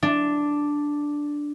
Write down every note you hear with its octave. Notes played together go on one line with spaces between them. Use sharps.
D4